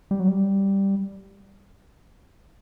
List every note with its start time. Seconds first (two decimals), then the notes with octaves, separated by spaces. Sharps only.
0.11 G3
0.20 F#3
0.28 G3